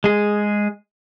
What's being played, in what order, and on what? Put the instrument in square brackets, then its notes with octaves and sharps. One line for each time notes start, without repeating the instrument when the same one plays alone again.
[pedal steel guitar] G#3 G#4